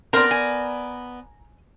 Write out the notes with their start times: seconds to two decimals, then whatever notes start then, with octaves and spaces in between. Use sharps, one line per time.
0.13 B3 C4 A#4 D5
0.31 G#5